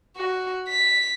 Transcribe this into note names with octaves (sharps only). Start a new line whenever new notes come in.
F#4
B6